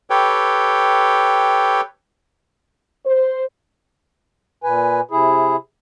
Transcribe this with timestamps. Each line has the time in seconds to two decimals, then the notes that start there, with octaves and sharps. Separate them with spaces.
0.10 G4 A4 B4 C#5 G5
3.06 C5
4.63 A#2 B4 G#5
5.11 C3 E4 G#4